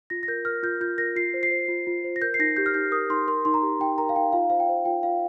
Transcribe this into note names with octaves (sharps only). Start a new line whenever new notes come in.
F4 A#6
A#6
A#4 G6
A#4 F6
F4 G6
F4 G6
A#4 A#6
F4 C7
C5
C7
C5
F4
F4
C5
A#6
A#4 G6
C7
D#4 A#6
G4 G6
F6
D#4 G6
A#4 D#6
D#4 C6
A#4 C6
D#4 C6
A#5
G4
D#4 G5
A#4 A#5
F5
D#4 G5
F4 F5
C5 F5
G5
C5
F4 G5
F4 F5